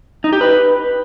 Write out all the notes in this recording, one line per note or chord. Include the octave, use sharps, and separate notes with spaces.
D#4
G4
B4